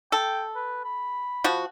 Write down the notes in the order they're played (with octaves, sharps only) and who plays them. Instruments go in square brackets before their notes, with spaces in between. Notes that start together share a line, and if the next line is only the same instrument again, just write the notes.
[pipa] A4 [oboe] G5
[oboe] B4
B5
[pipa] F3 F#4